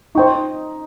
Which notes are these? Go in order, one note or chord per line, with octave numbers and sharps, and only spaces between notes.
D#4 C5 G5 C#6